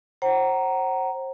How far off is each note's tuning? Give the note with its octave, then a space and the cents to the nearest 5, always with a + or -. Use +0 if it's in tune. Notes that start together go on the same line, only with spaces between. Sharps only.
C5 +35 F#5 +35 A#5 +0